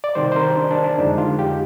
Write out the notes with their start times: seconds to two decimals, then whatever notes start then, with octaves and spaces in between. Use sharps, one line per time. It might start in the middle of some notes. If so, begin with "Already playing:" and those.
0.04 D5
0.15 C3 D#3 G3 C5
0.32 C5
0.36 A#4
0.57 D4
0.71 D4
0.84 D4
0.98 F2 D3 F3 G#3 D#4
1.18 F4
1.39 G4